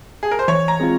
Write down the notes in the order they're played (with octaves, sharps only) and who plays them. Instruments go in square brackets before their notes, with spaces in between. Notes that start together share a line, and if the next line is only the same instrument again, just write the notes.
[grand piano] G#4
A#4
C5
[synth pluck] E3 [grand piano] C#5
[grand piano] A#5
[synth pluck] G#3 C4 F4